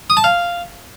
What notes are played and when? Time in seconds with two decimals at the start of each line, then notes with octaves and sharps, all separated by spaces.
0.10 D#6
0.17 A5
0.24 F5